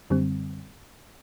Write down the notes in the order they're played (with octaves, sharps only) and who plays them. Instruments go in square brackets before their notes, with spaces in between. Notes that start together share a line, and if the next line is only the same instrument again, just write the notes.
[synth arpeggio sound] F#2 D3 G3 C4